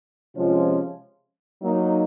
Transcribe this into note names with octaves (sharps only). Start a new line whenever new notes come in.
C3 F3 G#3 C#4 F4
F#3 A#3 D#4